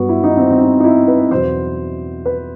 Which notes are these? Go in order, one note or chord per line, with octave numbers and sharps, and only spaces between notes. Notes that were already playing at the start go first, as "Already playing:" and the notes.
Already playing: G2 F#3 B3 F#4
E4
D#4
C4
C4
D#4
D#4
E4
B4
E2 B2 F#3 C5
B4